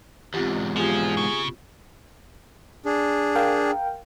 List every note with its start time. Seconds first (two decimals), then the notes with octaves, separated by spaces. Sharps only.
0.34 E2 G#2 C4 F4 G4
0.76 F3 B3 F4 G4 G#4
1.17 C#3
2.85 D4 G#4
3.35 A#4 F5 G5